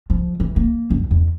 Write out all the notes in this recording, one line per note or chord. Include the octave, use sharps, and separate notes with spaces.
F3
E3
A#3
F#2
E2